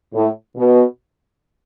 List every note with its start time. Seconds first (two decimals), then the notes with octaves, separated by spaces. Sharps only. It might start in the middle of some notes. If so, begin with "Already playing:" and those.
0.14 A2
0.56 B2